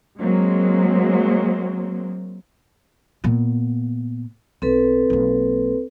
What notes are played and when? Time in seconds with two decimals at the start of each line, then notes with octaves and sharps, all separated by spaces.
0.19 F#3 G#3 A#3 C4
3.24 A#2 B3
4.62 B1 C4 A4 B4
5.10 B1 A#3